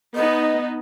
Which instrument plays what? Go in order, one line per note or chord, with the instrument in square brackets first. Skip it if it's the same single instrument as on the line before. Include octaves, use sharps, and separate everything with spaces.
[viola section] B3 D#4 [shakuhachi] D#5